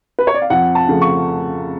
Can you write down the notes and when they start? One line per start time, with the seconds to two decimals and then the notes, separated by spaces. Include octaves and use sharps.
0.19 B4
0.27 C#5
0.34 D5
0.42 F5
0.50 F2 F#5
0.75 A5
0.88 C#3 F3 A3
1.02 C#6